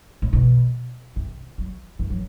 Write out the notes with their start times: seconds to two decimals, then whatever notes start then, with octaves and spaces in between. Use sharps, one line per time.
0.22 A2
0.33 B2
1.16 C3
1.58 F#3
1.99 E3
2.10 F#3